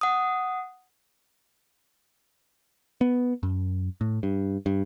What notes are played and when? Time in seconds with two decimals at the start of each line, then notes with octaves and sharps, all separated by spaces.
0.01 F#5 D#6
3.01 B3
3.43 F#2
4.01 A2
4.23 G2
4.66 G2